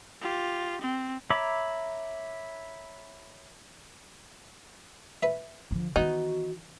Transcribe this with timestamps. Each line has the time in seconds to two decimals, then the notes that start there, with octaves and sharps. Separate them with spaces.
0.21 F4 G4
0.82 C4
1.30 C#5 E5 A#5 B5 D6
5.23 B4 E5
5.71 D3 F3
5.96 D#3 E3 B3 D#4 F#4